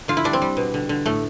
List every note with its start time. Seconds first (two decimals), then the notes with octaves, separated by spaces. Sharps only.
0.08 D3 F4
0.17 E4
0.24 G3 D4
0.33 C4
0.42 G3
0.57 B2
0.74 D3
0.89 D3
1.06 A2 A3